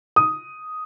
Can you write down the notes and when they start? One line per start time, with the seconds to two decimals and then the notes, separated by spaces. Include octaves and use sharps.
0.16 D#6